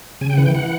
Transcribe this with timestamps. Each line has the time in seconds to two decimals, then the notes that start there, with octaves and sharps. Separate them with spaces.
0.21 C#3 G#5
0.30 G5
0.37 E3 F#5
0.46 G5
0.55 E3 F#5